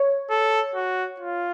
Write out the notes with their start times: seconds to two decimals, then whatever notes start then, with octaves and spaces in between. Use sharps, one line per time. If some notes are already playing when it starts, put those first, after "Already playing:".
Already playing: C#5
0.30 A4
0.75 F#4
1.20 F4